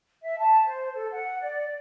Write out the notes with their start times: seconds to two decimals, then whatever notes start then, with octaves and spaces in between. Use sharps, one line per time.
0.23 E5
0.38 A5
0.66 C5
0.94 A4
1.12 F#5
1.40 D5